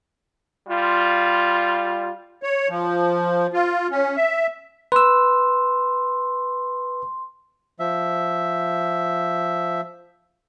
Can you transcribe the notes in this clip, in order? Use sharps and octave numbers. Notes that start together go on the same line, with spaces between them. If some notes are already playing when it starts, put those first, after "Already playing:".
G3 F4
C#5
F3
F4
C#4
E5
B4 C6 E6
F3 E5